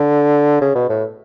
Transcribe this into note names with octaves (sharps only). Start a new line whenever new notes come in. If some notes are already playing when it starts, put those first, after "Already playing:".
Already playing: D3
C#3
B2
A2